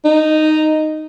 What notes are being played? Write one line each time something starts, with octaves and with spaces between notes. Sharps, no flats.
D#4